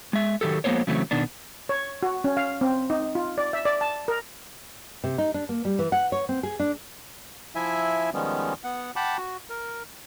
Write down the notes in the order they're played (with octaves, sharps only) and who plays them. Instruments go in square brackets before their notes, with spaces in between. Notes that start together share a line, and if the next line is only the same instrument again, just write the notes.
[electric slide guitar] G#3 E5
D#3 F#3 G4 A4
F3 G#3 A#3 B3 C5 C#5
C#3 E3 F#3 A3 C4
B2 D#3 D4
[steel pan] C#5
F#4
C#4
F5
C4
D#4
F4
D5
E5
D5
A5
A#4
[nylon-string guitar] C3
D#4
D4
A#3
G3
E3
F#5
C#5
C4
G#4
D4
[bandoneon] F3 E4 E5 G#5
D#3 F3 G3 G#3 B3 C#4
B3 F#5
F#5 G5 A5 B5 D6
F#4
A#4